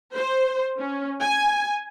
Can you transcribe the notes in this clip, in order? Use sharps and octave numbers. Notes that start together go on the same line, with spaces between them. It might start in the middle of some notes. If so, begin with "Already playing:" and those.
C5
C#4
G#5